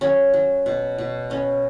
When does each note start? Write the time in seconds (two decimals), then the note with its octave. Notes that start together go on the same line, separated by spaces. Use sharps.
0.01 F#3 C#4
0.34 F#3
0.66 B2
0.98 B2
1.30 B3 C#4